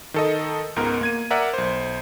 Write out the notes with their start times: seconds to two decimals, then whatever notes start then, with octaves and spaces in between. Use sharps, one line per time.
0.14 D#3 A4 D#5
0.76 C#2 G#2 B3 A#4
1.01 A#3 G#6 D#7
1.31 A#4 D5 E5 F#5
1.54 B1 C5